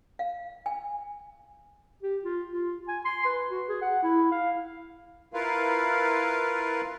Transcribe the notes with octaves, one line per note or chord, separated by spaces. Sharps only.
F5
G#5
G4
F4
F4
G#5
C6
B4
F#4
G#4
F#5
E4
F5
E4 F4 A#4 B4 F5